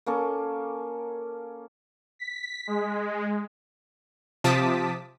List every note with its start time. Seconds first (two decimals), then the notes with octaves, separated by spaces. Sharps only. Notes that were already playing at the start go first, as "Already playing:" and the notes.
0.06 A#3 C#4 A4
2.19 B6
2.67 G#3
4.44 C3 F3 A5 D6 D#6 B6